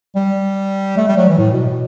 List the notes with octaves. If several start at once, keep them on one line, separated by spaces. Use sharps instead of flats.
G3
A3
G3
F#3
E3
A2
B2
B2